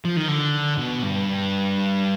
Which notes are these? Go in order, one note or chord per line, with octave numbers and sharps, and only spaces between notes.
F3
D#3
D3
B2
G2